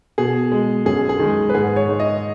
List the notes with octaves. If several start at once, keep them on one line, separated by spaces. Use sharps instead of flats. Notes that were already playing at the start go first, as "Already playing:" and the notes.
B2 G#4
G#3
F#2 G#4
G#4
D#3 G#3
B4
G#2 G#4
C#5
D#3 G#3
D#5